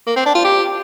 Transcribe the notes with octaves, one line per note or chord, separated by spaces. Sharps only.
A#3
C4
D4
F4
G4